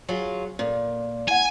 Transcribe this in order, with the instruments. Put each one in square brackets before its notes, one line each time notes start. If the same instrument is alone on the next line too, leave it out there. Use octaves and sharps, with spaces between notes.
[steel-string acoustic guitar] F#3 F4 G#4
[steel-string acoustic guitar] A#2 [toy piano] A4 A#4
[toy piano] E4 D5 F#5 [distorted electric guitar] G#5